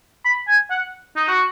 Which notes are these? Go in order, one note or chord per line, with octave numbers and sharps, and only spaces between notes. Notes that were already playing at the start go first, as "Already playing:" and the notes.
B5
G#5
F#5
D#4
F#4